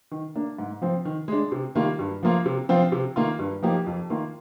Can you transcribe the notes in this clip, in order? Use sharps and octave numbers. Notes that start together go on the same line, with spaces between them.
D#3
A#3 D4
G#2
F3 C4
D#3
G#3 D4
C3
D#3 G3 A#3 F4
G2
F3 A#3 F4
C3
F3 C4 F4
C3
D#3 A#3 F4
G2
F3 A#3 D#4 G4
F2
D#3 A#3 F4